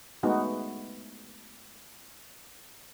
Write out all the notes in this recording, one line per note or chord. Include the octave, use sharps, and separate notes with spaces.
G#3 A3 B3 D#4 F#4